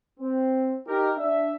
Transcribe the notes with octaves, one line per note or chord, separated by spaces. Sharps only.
C4
D#4 G4 A#4
D4 E5